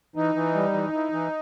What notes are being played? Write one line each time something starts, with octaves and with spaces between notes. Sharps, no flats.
E3 D#4
E3
G3
E3
E3
E3